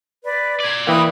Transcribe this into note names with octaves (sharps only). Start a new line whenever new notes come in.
B4 D5
A#4 D5 G#6
E3 A#3 G5 B5 D#6